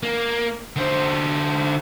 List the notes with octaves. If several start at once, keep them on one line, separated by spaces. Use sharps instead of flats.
A#3
D3 C5